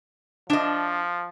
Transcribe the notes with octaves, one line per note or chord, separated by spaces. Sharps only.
F3 D4 D#5